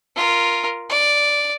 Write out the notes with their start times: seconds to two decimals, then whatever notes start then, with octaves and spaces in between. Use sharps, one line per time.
0.16 F4 A#4
0.90 D5